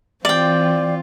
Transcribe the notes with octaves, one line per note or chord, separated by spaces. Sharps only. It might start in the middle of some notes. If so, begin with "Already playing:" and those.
E3 C4 F4 D5 G5